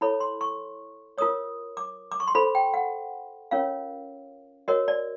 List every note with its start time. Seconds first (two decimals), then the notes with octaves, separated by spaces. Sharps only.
0.01 E4 A4 C#5 B5
0.20 C6
0.41 C#6
1.18 F4 A#4 C#5 D#6
1.77 D6
2.12 D6
2.20 C#6
2.27 C6
2.35 F4 A4 C5 B5
2.55 G5
2.74 F#5
3.51 C#4 F4 A#4 C#5 F5
4.68 F#4 A#4 C#5 D#5
4.88 D5